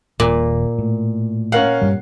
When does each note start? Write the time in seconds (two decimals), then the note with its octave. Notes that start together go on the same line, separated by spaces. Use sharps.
0.20 D#1 A#2
0.78 A2
1.52 C#4 A#4 F5 F#5
1.82 G2 G3